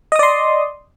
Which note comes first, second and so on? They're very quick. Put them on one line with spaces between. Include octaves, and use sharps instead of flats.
D#5 D#6 D5 C6